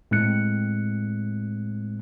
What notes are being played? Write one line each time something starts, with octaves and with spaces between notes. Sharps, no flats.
A2 G#3 C4 F#6 C#7